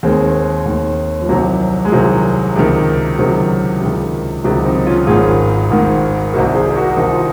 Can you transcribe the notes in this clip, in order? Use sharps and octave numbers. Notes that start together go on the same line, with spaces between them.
D#2 D#3 G#3 C4
D#2 D#3
F3
C2 C3 D#3 F#3
G#3
C2 C3 D#3 F#3
C#2 C3 D#3
C#2 C3 D#3 F#3
C#2 C3 D#3
C#2 C3 D#3 F#3
C4 D#4
C#4 F4
G#1 G#2 D#3 F4 G#4
G#1 G#2 D#3
C2 C3 D#3 F#4 A#4
G#4 C5
C5
F#4 A#4
C2 C3 D#3 D#4
F4